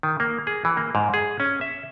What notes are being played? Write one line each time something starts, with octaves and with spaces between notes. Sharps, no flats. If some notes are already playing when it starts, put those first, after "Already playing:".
D#3
A#3
G#4
E3
A#3
G#2
G#4
C#4
E5